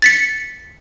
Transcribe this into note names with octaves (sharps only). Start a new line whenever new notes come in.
A6 B6 C#7